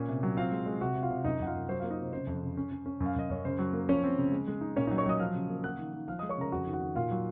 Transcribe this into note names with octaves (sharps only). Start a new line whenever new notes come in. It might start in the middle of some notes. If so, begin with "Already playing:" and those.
Already playing: A#2 C#4
C3
F#3
C4 F4 F5
G#3
G#3
C3 F#4 F#5
C3
F4 F5
C3
F#2 D#4 D#5
F#2 F#5
F4 F5
F#2
F#3 C5
F4 F5
A#3
D#4 D#5
C3 C5
C#3 C5
F2
C#3
C#4
C#4
C#4
F#2
F5
F#2 D#5
F#2 C#5
C#3 C5
F#3
A#3
F3 C#4 C#5
C4
C#3
G#3
G#3
D#4
A#2 C#4 C#5
D#4 D#5
F#3
C#5 C#6
F#3 D#5 D#6
F3 F5 F6
C#3
A#3
A#3 F#5 F#6
D#3
D#3
F3 F5 F6
D#5 D#6
G#3
C#5 C#6
C#3 A#4 A#5
F2 F#4 F#5
D#3
F#4 F#5
D#3
A#2 F4 F5
F#3